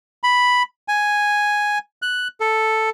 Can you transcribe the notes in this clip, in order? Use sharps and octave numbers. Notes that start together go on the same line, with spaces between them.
B5
G#5
F#6
A4